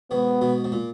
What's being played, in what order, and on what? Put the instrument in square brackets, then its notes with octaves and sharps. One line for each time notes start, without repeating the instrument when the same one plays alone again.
[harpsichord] G#2 B2 [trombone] B3
[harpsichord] G#2 B2
G#2
A#2